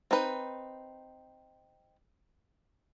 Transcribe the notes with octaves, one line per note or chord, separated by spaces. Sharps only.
C4 D#4 B4